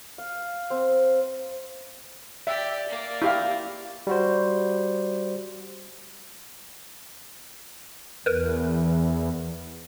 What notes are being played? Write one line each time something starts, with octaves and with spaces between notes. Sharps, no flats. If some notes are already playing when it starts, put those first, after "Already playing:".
F5
C4
G4 D5 E5
A#3 D5
E4 G4 F5
G3 F#4 C5
E2 A#4 B4